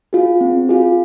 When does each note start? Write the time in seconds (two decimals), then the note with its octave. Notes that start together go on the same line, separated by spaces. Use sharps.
0.13 F4 G#4
0.41 C4
0.69 F4 G#4